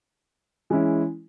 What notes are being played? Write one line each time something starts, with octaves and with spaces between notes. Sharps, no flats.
E3 G#3 C#4 E4